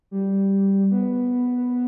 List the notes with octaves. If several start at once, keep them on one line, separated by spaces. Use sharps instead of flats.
G3
B3